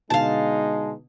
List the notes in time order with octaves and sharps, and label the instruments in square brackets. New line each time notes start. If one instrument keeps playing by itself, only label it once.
[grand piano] B2 D3 B3 [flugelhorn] G#3 [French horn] D#4 [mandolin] F5 A5